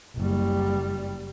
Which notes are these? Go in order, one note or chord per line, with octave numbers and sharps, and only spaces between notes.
F#1 G3